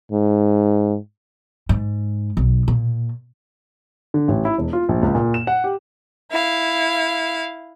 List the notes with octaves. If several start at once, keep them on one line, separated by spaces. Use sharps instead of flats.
G#2
G#2
B1
A#2
D3
A1
E4
E1
F4
A#1
C#2
A#2
E7
F#5
G4
E4 F5